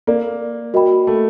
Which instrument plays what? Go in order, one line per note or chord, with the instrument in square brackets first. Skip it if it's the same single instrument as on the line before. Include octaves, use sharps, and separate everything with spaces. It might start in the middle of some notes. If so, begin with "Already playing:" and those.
[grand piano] A#3 [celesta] A#4 D5 F5
[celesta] F#4 A#4 D#5 G5 B5
[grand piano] A3